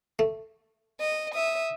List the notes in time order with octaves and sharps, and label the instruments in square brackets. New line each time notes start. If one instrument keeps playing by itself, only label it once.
[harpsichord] A3
[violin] D#5
[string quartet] E5 [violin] D#6